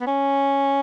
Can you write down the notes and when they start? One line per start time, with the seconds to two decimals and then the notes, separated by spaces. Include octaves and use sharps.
0.01 B3
0.07 C#4